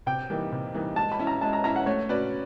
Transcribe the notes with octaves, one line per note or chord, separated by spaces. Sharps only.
C3 G5
E3 G3 A#3 D#4
C3
E3 G3 A#3 D#4
G#3 A5
B5
C#4 E4
A#5
G#3 A5
A#5
C#4 E4 A#5
F#5
A3 C#5
C#4 F#4 B4 D5